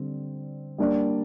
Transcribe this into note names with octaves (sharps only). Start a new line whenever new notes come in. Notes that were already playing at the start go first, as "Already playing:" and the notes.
Already playing: D3 G3 C4
G3 A#3 D4 A#4 D5